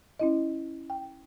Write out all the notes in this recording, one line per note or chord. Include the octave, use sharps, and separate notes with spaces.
C#4 E4 D#5
G5